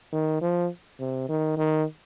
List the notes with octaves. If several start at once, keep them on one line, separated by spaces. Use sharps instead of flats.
D#3
F3
C3
D#3
D#3